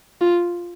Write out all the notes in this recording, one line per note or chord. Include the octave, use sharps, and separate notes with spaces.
F4